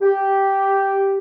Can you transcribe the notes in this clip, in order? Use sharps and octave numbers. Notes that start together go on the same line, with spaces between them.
G4